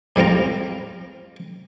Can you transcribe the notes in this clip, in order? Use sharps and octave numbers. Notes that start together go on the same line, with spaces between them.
A2 G3 C4 F4 A#5